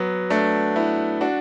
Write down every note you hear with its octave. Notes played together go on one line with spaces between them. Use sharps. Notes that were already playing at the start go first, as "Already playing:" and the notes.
Already playing: F#3 B3
A3 D4
B3 E4
D4 F#4